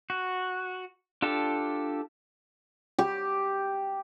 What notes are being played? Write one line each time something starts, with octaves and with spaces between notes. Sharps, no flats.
F#4
D4 F4 G4 A4 A5
G4